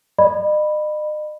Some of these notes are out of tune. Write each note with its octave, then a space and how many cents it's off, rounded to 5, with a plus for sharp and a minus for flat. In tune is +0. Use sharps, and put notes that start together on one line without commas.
D#5 -40 B5 +0